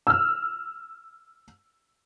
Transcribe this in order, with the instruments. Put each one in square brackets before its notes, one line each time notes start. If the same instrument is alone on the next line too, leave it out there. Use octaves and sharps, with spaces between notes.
[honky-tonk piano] E6 F6